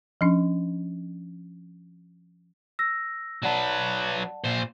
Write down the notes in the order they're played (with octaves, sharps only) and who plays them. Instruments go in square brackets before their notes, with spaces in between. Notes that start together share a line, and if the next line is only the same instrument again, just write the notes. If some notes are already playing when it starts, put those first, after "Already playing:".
[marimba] F3 C#4 D4
[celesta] E6 A#6
[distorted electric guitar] F#3 B4 [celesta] D5 F#5 A5
[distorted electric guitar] A#2 C5